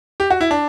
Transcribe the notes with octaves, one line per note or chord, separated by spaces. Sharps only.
G4
F#4
E4
D4